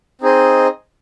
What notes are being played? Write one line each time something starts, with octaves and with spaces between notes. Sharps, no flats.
C4 D#4 G#4 C5 D#5